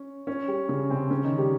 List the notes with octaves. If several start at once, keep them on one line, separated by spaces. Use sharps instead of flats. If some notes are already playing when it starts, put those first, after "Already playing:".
Already playing: C#4
C#4 C#5
G3 G4
C#3 C#4
C3 C4
C#3 C#4
D#3 D#4
G3 G4